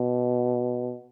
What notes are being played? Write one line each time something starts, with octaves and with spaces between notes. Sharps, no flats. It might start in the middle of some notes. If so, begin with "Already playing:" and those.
Already playing: B2